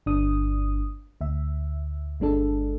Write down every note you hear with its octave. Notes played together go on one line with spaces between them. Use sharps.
G1 D4 D#6
D2 E5
G1 G#3 D4 A4